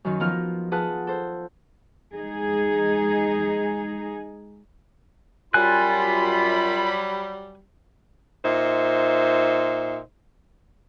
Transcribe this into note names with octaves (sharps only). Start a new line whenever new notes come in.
F#2 D#3
F3 B3 D#4 F4 A#4 F6
F4 G#4 B4 F#5 A5 D#6
A4 C5
G#3 D#4 G#4
F#2 F#3 G3 F4 G#5 B5 F#6
A#2 D#4 C5 E5